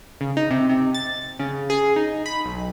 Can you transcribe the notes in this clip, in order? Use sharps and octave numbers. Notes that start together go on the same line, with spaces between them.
C#3
D#4
C3
C3
A6
C#3
G#4
D#4
B5
B1